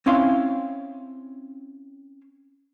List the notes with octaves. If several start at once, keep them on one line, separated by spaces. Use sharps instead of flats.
C4 C#4 E4 F5 C6